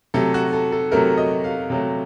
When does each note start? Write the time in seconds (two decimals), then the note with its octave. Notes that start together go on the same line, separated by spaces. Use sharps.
0.14 C3 F#3 A3 A4
0.34 F#4
0.53 A4
0.72 A4
0.92 C3 F#3 A3 A#4
1.17 D#5
1.44 F5
1.70 C3 F#3 A3